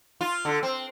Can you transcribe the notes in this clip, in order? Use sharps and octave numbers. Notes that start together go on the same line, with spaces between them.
F4
D3
C4